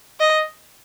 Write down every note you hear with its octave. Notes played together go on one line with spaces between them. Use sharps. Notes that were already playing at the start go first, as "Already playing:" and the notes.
D#5